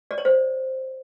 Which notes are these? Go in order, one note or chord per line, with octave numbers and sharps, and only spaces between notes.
D5
C#5
C5